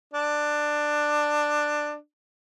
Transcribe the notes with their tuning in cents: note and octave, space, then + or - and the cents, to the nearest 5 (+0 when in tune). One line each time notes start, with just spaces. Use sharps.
D4 +15